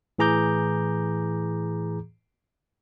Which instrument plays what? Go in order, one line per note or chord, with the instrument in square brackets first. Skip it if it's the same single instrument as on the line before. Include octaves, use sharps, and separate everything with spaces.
[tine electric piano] A2 E3 G#4 A#5 D6 G6